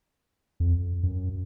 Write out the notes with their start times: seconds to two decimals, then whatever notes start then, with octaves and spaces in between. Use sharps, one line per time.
0.60 F2
1.03 F#2